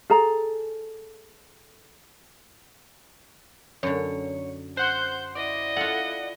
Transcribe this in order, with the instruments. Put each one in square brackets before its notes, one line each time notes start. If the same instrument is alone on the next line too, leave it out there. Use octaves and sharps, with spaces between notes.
[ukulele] G#4 A4 A#5
[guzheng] F#2 D3 [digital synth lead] C#5
[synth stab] C5 F#5 C6 [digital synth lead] F#6 [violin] G6
[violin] E4 D#5 [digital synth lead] D5
[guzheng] F4 A4 [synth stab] F#5